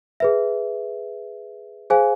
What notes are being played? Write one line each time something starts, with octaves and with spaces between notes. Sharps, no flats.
G#4 B4 E5
G#4 C5 F5 G#5